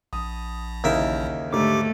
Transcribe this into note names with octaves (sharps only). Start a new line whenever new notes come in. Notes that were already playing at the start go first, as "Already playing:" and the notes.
A#1 D#6
D#2 C#3 E3 D#4 A#4 E5
G#2 D3 A3 G4 D6